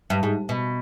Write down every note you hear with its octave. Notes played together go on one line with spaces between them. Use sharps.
G2
G#2
B2